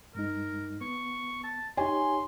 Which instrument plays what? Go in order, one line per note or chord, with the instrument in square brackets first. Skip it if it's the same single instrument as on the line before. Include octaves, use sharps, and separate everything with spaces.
[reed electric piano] G2 G#3 D#4 [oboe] A#4
[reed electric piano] B3 [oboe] C#6
[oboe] A5
[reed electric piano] D#4 G4 C#5 [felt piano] G#5 [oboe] C6